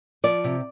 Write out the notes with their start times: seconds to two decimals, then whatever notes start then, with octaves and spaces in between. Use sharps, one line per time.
0.24 F3 D5
0.44 C3